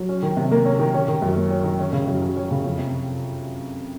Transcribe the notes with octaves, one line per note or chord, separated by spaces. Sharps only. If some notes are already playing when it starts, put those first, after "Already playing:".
Already playing: F#3
C#4
D#3
C3
A#3
C#4
D#3
C#4
D#3
F#2
A#3
C#4
D#3
C#4
C#3
F#2
F#3
C#4
C#3
F2
C3